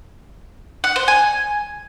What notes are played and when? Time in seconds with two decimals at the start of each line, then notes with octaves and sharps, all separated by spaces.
0.84 F#5
0.96 C5
1.08 G#5